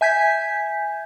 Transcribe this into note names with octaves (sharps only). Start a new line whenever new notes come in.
E5 G#5 G6 G#6 B6